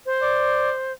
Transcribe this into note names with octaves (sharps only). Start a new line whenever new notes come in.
C5
D5